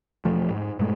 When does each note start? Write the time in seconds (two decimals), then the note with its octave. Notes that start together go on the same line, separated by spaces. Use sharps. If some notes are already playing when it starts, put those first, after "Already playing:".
0.25 E1 F3 A3
0.51 G#2
0.79 G2 A#2 G#3 A3